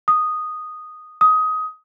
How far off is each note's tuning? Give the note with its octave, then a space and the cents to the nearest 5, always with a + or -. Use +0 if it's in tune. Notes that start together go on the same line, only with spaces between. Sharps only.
D#6 -5
D#6 +15